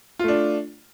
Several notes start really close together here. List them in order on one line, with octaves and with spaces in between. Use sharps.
F4 A3 D4